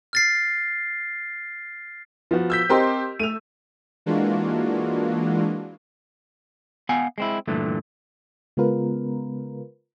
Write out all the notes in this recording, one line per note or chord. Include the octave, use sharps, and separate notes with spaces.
F6 A6 C7
F3 B3 F#4
E6 G6 B6
C4 G4 A#4 D#5 G5 C6
A3 E6 D#7 F7
E3 G#3 A#3 D4 F4 F#4
B3 F5 F#5 G#5
G#3 C4 E4
G2 A#2 D3 E3 A3
C#3 G#3 B3 F4 A#4 B4